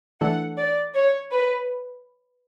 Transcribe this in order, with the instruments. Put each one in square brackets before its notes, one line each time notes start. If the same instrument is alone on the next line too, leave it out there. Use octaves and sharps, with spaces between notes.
[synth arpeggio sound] E3 A3 D4 A4 [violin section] F#5
[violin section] D5
C#5
B4